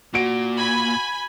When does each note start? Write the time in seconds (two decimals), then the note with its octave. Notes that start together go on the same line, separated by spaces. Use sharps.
0.14 A#2 F#4 D7
0.57 G#5 B5